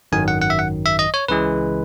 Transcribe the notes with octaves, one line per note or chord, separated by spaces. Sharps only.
G#1 F#2 D#3 F#3 G#5
F#5
F#5
E5
F#5
E5
D#5
C#5
C#2 C#3 E3 G#3 B4